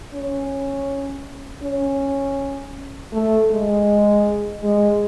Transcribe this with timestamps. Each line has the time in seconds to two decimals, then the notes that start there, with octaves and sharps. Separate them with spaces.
0.13 C#4
1.63 C#4
3.13 A3
3.51 G#3
4.63 G#3